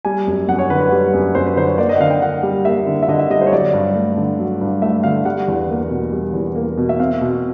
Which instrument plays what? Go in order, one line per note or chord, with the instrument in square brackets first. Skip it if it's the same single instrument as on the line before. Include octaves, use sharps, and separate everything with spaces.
[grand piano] G3 G#5
F#2
F#2 F#5
C#5
D3 B4
B4
G3
F#2
F#2 C5
B4
D3 C5
C#5
A#3 D5
D#5
F#5
D3 F5
G5
D3 F#5
G3
A#3 E5
D3
E5
D3 D#5
E5
G3 D#5
C5
C#5
F#3 D5
G2
A3
D3
F#3
G2
A3 E5
D3 F5
G3 F#5
E2
A#3
B2
G3
E2
A#3
B2
E5
C4 F5
B2